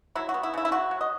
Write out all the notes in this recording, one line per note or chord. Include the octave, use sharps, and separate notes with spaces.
F#3 E4
F#4
B3
E4
C#3 E4
E4
C#3 F#4
F#3
D#5